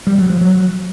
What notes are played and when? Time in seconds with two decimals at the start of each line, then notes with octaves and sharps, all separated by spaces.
0.07 G3
0.18 F#3
0.30 F3
0.41 F#3